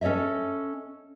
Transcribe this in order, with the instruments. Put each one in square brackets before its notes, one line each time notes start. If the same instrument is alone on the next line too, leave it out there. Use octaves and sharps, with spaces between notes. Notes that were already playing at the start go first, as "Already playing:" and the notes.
[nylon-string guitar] C#4 A4 C#5 D#5 E5